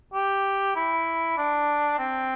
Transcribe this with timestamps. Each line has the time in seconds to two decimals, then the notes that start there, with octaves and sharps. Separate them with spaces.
0.14 G4
0.76 E4
1.38 D4
1.99 C4